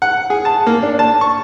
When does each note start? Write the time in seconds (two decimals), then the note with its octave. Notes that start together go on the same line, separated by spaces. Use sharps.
0.02 F#5
0.30 G#4
0.45 A5
0.67 A#3
0.83 D4
0.99 A5
1.21 C#6